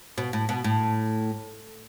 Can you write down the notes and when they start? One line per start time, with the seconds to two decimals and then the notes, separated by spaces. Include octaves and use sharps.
0.18 B2
0.33 A2
0.49 B2
0.64 A2